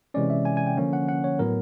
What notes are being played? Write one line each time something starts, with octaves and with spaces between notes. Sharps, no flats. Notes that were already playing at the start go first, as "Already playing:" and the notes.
C3 E3 G#3 C#4 D5
E5
G#5
G#5
G5
D3 F3 A#3 C#4
F#5
F#5
C#5
A2 F#3 B3 A#4